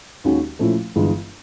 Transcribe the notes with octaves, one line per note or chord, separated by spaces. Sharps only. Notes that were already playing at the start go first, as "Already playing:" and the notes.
D#2 D#3 G#3 C#4 F#4
A#2 F3 A3 C#4 E4
G1 G2 E3 G#3